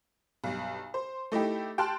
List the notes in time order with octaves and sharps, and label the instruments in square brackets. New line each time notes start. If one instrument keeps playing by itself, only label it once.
[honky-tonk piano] B1 G2
C5
A3 D#4 E4 G4
G5 A5 C6 F6 F#6